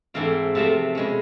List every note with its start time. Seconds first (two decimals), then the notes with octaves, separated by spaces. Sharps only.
0.14 G#2 E3 A3 C4 F4
0.55 C3 F3 A3 C4
0.95 B2 G#3 C#4